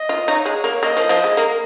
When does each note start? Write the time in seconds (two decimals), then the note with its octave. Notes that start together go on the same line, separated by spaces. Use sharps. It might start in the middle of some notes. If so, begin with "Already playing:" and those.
Already playing: D#5
0.09 F4
0.28 D#4 C#5
0.46 G#3
0.64 A#3
0.82 A#3 D#5
0.97 F3
1.09 F3
1.24 G#3
1.37 A#3